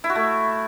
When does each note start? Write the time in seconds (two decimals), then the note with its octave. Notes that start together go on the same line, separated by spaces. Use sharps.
0.04 E4
0.10 F#4
0.15 A3